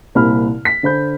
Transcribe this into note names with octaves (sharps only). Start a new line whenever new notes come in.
C2 A#2 C4 B5 F6
B6
D3 C5 B5 G6